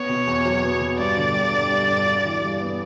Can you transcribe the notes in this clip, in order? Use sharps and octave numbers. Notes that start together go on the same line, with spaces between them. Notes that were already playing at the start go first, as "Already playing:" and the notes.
Already playing: B3 C#5
B2
E2
F#3
B3
B2
G2 D5
D3
G2
G3
G2
D3
F#4
E3
G2
B3